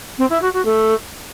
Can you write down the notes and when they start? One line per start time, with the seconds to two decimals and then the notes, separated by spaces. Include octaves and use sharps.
0.18 C4
0.30 E4
0.42 F#4
0.53 F#4
0.65 A3